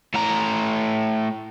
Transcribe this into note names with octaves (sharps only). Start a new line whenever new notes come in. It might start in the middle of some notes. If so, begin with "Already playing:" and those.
A2 A#5